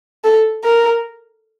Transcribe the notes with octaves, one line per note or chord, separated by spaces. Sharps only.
A4
A#4